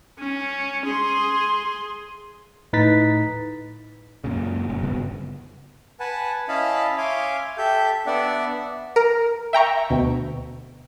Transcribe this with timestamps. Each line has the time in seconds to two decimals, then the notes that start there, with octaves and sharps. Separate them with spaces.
0.19 C#4
0.85 G#4 C6
2.73 A2 D#4 B4 A6 B6
4.24 F#2 A#2 C#3
4.69 F#1
4.82 F#1 G2 C#3 B3
6.00 B4 F#5 G#5 A5
6.48 C#4 E4 D#5 F5 A5 B5
6.98 C#5 E5 F5 G#5 C6 D6
7.58 G4 A4 E5 G6
8.06 B3 D4 D5 E5 F#5
8.96 A#4
9.53 E5 G5 A#5 C#6
9.90 D2 B2